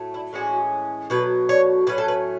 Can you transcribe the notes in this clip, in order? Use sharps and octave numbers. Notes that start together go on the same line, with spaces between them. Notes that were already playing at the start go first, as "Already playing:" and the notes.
Already playing: A2 F#3 A3
E4
A2 E3 G#3 C#4 F#4
B2 F#3 A3 B4
C#5
A2 F#3 A3 C#4 B4
A4
B4